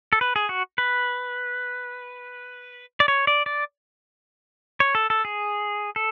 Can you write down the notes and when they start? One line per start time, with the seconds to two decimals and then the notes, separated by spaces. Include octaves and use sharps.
0.13 A4
0.21 B4
0.36 G#4
0.49 F#4
0.78 B4
3.00 D5
3.08 C#5
3.27 D5
3.46 D5
4.80 C#5
4.95 A4
5.10 A4
5.25 G#4
5.96 A4